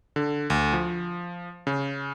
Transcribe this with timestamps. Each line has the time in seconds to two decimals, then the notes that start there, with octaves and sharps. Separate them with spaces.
0.16 D3
0.50 D2
0.73 F3
1.67 C#3